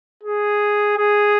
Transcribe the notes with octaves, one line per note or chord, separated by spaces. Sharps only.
G#4
G#4